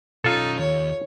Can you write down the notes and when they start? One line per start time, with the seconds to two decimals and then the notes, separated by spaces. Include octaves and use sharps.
0.24 B1 C#4 D#4 F4 A4
0.59 D#2 C#5